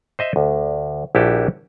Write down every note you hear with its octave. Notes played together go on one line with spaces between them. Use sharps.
C5 D#5 E5
D2
A#1 E4 F#4 G4 A5